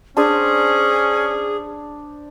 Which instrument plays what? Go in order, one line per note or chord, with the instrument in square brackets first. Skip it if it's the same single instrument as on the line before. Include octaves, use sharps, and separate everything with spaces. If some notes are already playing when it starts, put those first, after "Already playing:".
[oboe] C#4 [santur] D4 C5 [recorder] G#4